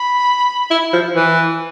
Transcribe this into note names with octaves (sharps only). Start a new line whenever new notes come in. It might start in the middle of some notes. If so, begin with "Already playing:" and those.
Already playing: B5
E4
F3
E3